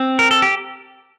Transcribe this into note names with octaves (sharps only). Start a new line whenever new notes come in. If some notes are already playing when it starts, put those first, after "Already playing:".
Already playing: C4
A#4
A4
G4